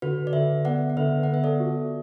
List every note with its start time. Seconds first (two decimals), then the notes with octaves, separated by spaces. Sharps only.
0.02 D3 F#4 B4
0.27 D5
0.33 D3 B4 E5
0.65 B3 D5 F#5
0.89 F#5
0.97 D3 B4 E5
1.23 B3 F#5
1.34 E5
1.44 A4 D5
1.60 F#4